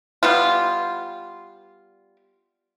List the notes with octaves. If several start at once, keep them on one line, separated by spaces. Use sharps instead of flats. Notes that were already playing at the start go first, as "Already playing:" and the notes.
G3 B3 F4